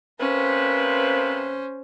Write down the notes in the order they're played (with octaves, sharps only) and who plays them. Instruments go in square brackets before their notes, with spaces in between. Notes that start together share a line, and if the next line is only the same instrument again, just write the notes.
[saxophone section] C3 A#3 B4 [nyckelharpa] C#4 C5